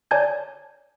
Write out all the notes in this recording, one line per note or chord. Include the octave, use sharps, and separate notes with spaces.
C#5 D5 G#5 A5 G6 G#6